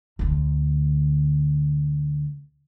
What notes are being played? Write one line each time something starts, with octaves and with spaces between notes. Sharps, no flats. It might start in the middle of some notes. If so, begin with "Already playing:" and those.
D2 D3